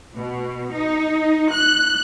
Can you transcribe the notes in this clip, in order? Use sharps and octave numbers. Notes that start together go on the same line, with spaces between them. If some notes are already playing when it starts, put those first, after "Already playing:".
B2
D#4
F#6